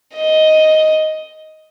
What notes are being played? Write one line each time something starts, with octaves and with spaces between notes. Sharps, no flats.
D#5